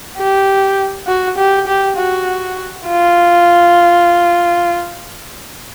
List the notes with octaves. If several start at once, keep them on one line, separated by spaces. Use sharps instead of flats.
G4
F#4
G4
G4
F#4
F4